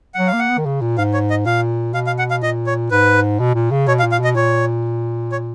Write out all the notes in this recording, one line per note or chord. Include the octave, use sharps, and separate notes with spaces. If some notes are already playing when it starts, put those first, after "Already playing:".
F#3 F#5
F5
A#3
F#5
B3
D#3
C#3
A#2
G#2 F5
C#5
D#5
A#2 F5
B2 F5
F5
F#5
F5
A#2 D#5
C#5
G#2 B4
B2
A#2
C#3
B2 C#5
F5
A#2
F5
B2 D#5
A#2 C#5
C#5